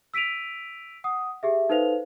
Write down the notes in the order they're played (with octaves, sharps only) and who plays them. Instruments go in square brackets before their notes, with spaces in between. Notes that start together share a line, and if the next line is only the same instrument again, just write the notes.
[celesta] E6 B6 D7 D#7 F7
F#5 D#6
G4 G#4 E5
D#4 A4 B4 C5 F5 F7